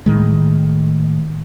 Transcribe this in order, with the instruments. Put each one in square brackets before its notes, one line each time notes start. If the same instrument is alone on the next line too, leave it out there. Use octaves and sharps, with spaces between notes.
[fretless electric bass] A2 D#3 G#3